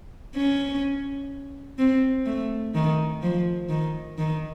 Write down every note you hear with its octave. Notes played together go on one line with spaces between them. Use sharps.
C#4
C4
A3
D#3
F3
D#3
D#3